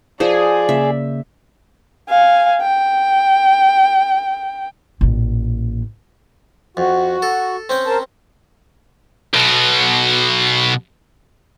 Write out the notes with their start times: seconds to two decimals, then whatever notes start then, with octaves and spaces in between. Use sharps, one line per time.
0.20 F3 G#4 C5 D5
0.69 C#3 A#3 E5
2.10 F5 G#5
2.62 G5
5.01 A1 A#2
6.77 F2 F#4
7.22 A4
7.69 C4 C#4 G5
7.87 A#4 C5 A5
9.34 B1 B2